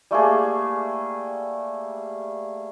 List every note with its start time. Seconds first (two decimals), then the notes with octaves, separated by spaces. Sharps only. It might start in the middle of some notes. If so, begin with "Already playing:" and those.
0.11 G3 A3 A#3 G#4